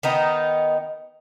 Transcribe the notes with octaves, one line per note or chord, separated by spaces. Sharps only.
D#3 B3 D#4